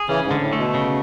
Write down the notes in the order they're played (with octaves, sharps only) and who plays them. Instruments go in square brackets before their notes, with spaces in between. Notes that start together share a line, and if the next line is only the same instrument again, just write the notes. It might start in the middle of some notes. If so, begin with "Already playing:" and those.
Already playing: [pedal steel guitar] G#4
[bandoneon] C#3 E3 [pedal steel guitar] C#4
[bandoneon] G#2
[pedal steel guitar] D3
[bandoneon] A2
[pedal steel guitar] A3
[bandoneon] B2
[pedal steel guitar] C#3